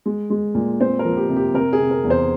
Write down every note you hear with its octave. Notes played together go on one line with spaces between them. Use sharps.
G#3
G#3
A#2
C4 C5
A#4
F3
G4
C3
G4
C3 A#4
G#4
C3
A#4
E2
C5